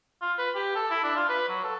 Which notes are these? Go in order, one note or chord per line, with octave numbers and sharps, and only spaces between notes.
F4
B4
G4
A4
E4
D4
F4
B4
F#3
A4